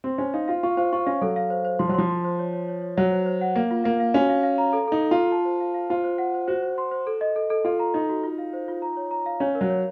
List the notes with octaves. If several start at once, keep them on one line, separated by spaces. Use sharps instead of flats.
C4 C6
C#4 C5
D#4 F5
F4 F5
F4 C#6
F4 C5
F4 C#6
C#4 F5
F#3 A4
F5
C5
C5
F3 C6
F#3
F3 C6
C6
C5
C#5
C#5
C#5
C#5
F#3 F#5
C5
C5
F#5
A#3 F5
F4
A#3 F5
F5
C#4 F#4
F5
F5
A#5
A4
D#4 A4
A4
F4 A4
A5
C5
F5
F5
F4 C5
C5
F#5
C5
F#4 C5
C5
C6
C5
A4
D#5
A4
A4
F4 A4
A#5
D#4 D#5
F#4
F4
F5
C5
F4
A#5
C#5
A#5
F5
C#4 C#5
A#4
F#3
C#5